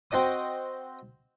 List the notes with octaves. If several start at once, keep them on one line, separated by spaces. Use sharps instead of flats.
C4 F#4 D#5 D#6